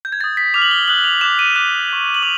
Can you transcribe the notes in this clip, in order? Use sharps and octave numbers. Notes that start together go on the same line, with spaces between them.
G6
G#6
D#6 G6 A6
B6
D6 F6 F7
F#7
G7
D#6 F#6 F#7
F7
D6 F#6 E7
D#7
D6 F#6 E7
C#6 F#6
F#7
D6 F7